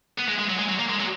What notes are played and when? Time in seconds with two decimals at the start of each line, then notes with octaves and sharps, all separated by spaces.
0.19 B3
0.29 G#3
0.40 G#3
0.50 F#3
0.59 G#3
0.69 F#3
0.80 A#3
0.90 G#3
1.00 F#3